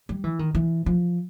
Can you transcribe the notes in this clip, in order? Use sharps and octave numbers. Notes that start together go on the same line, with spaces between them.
G3
E3
D#3
E3
F3